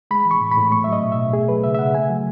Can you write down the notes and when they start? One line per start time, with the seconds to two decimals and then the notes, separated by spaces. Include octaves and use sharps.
0.11 G#3 B5
0.26 E3
0.31 C#6
0.41 A2
0.52 B5
0.57 A2
0.72 A3 C#6
0.84 F#3 E5
0.93 D#5
1.03 B2
1.12 E5
1.18 B2
1.33 A3 G#4
1.49 F#3 B4
1.64 C#3 E5
1.74 E5
1.79 C#3 F#5
1.95 A3 G#5
2.10 F#3